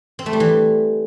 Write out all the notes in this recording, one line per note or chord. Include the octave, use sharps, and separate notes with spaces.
C4
A3
G3
E3